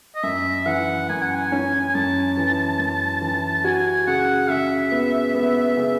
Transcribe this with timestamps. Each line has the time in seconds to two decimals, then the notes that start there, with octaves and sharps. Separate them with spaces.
0.15 D#5
0.23 F#2 E5
0.66 E3 F#5
1.09 F#2 G#5
1.22 F#5
1.35 G#5
1.52 C#4
1.90 G#5
1.94 F#2 A5
2.37 E3
2.79 F#2
3.22 E3
3.64 F#4 G#5
4.07 C#3 F#5
4.50 C#3 E5
4.92 B3
5.35 B3
5.77 C#3